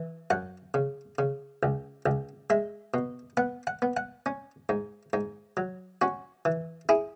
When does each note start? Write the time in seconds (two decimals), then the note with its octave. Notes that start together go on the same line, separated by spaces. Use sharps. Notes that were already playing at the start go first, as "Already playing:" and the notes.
Already playing: E3
0.30 F#2 F#5
0.74 C#3
1.19 C#3
1.63 C#2
2.06 C#2
2.50 G#3 E5
2.94 B2
3.37 B3 F#5
3.67 F#5
3.82 B3
3.97 F#5
4.26 C#4
4.69 G#2
5.13 G#2
5.57 F#3
6.01 C#4 F#4
6.45 E3
6.89 E4 G#4